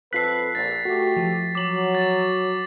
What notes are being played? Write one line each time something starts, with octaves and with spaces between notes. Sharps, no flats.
F2 F4 A4 B4 F#6 B6 C7
A#1 A6
A3 F#4 G4
F3
F#3 D6 F#7
A6